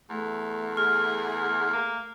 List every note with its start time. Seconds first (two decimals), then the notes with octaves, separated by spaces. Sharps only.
0.10 E2 A3
0.77 G#4 F6
1.73 A#3